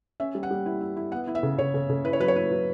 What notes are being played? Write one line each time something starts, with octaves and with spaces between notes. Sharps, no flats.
C#4 E5
G3
F#5
G3
E4
E4
E4
B3 F#5
E4
E5
C#3
C#3 C#5
C#3
C#3
E4 B4
C#5
F#3 B4
C#5
E4 B4
F#3